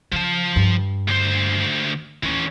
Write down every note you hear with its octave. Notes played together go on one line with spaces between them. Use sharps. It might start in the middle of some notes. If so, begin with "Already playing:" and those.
C#3 F3 A5
G2
D2 C5
D#2 E3 C#4